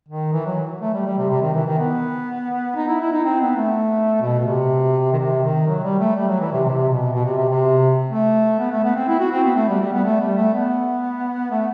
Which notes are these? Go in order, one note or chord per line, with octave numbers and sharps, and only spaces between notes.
D#3
E3
F#3
A3
G3
G3
C3
C3
D#3
E3
D#3
B3
D#4
E4
E4
D#4
C4
B3
A3
B2
B2
C3
D#3
C3
D#3
F#3
G3
A3
G3
F#3
E3
C3
C3
B2
B2
C3
C3
C3
A3
B3
A3
B3
C4
E4
F#4
C4
B3
A3
G3
G3
B3
A3
G3
A3
B3
A3